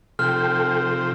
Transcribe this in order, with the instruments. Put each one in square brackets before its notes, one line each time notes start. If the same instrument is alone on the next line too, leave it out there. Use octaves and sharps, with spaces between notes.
[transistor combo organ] C3 F3 C5 [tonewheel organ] A4 G5 [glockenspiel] F6